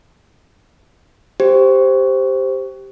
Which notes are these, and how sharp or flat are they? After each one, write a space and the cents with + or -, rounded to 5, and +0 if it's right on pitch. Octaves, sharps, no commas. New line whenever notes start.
G4 +0 C5 +0